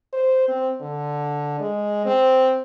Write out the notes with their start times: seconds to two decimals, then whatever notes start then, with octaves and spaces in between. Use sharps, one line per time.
0.13 C5
0.48 C4
0.81 D3
1.60 G#3
2.06 C4